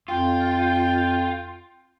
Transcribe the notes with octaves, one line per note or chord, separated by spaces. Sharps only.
F2 F4 G5